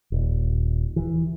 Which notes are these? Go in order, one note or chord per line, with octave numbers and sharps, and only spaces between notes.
D#1
E3